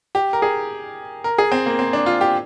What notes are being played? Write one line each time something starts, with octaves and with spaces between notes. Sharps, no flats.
G4
A#4
G#4
A#4
G#4
C4
A#3
C4
D4
F4
G4